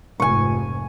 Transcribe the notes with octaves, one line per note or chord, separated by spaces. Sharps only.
F1 G#2 G#5 C#6